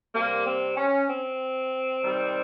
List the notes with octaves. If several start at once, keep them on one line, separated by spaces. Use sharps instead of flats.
C3 G3 A#3
C4
C#4
C4
C3 D#3 G3